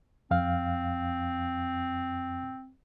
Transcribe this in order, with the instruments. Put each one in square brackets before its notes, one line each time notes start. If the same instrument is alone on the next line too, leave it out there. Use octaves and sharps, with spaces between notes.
[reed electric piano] F2 F5 [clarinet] C4